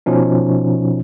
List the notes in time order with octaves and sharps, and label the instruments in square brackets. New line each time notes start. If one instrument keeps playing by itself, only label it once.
[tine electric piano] B2 F3 C#4 D#4